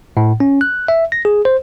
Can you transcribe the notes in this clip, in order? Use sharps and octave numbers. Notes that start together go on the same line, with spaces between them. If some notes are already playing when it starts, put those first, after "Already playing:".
A2
C#4
F#6
E5
A#6
G#4
C5